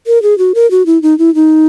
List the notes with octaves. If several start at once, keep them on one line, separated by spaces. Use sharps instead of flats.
A#4
G#4
F#4
A#4
F#4
E4
D#4
E4
D#4